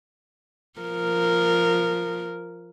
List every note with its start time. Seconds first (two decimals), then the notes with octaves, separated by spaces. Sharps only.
0.80 F3 A#4